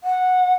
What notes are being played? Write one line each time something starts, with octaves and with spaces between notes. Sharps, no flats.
F#5